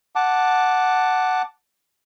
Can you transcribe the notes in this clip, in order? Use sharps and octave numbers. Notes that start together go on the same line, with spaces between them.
F#5 A5 D6